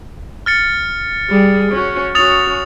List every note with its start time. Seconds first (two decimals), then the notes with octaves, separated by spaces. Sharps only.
0.46 F6 A6 C#7
1.29 G3 G#4
1.71 C#4 F#4
2.15 C#4 F#4 D#6 A6 F7